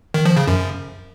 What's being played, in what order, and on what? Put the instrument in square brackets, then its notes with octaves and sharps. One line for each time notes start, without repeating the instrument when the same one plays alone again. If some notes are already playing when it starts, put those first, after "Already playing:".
[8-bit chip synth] D#3
F3
C#3
F#2